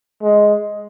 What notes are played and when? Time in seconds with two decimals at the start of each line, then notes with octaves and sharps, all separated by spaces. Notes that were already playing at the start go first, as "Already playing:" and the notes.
0.23 G#3